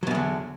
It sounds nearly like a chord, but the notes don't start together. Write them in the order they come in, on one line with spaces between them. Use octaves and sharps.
F#3 B2 E2 D3